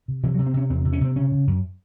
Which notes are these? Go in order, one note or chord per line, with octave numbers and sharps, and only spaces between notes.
C3
C3 E3
F#3
C3
C4
C3 C#4
E2 C4
C3
C#4
C3 C4
C#3 C#4
C#3
F#2